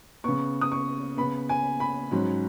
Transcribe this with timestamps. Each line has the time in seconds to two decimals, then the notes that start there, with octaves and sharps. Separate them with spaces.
0.24 C#3 B3 C#6
0.61 D#6
0.72 C#6
1.17 C#3 B3 B5
1.49 G#5
1.80 B5
2.11 G#2 F#3 C#4